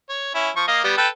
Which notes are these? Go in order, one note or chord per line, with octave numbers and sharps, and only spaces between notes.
C#5
C#4 E4
F3 C#6
A#3 D#5 F5
G3 B3
A4 B4 G5